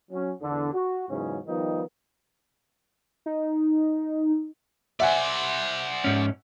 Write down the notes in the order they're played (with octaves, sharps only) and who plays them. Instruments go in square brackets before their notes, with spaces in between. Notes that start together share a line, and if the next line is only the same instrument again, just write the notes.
[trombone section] F#3 C#4
E2 D3
F#4
E2 G#2 C#3 F#3 C#4
D#3 F3 G3 B3 D#4
[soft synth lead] D#4
[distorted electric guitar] C5 D5 [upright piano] E5 F#5 G#5
[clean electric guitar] G#2 C#4